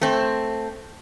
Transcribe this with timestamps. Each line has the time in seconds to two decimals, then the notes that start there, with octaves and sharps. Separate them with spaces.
0.01 A3 C4